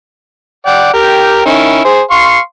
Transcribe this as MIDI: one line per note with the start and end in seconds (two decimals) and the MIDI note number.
0.66 0.90 74
0.66 0.90 78
0.66 0.90 79
0.93 1.45 67
0.93 1.45 70
0.93 1.45 79
1.45 1.81 51
1.45 1.81 61
1.45 1.81 64
1.84 2.01 68
1.84 2.01 72
2.11 2.39 77
2.11 2.39 84
2.11 2.39 85